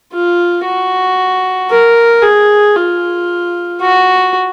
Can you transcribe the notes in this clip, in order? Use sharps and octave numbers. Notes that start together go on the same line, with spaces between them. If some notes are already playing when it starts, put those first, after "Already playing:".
F4
F#4
A#4
G#4
F4
F#4